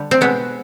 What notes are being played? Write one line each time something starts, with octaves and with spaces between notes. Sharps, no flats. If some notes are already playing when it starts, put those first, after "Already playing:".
Already playing: D3 G3
C4
B2 G#3 B3